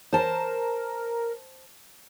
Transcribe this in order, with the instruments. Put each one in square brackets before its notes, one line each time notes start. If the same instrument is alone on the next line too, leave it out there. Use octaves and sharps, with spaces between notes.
[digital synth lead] A#4 [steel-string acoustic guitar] C5 A5